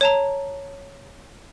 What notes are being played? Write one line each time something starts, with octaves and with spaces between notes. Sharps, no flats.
C#5 A5 A#5